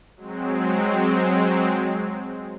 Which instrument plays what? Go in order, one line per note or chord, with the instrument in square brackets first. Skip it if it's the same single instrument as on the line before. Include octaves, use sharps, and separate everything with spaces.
[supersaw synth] F#3 G#3 C4